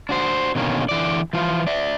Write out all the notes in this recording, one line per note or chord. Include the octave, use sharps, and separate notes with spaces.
D4 F#4 C5
B2 D3 D#3 A#3 C#4
D3 E3 D5
E3 F3 F4
D4 D5 E5